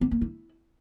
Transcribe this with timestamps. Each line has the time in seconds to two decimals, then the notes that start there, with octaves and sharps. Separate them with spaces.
0.01 B3
0.11 A#3
0.21 E4